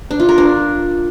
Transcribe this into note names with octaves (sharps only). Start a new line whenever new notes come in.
D4
F4
A#4
D4